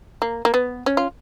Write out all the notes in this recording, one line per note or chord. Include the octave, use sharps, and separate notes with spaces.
A#3
A#3
B3
C#4
F4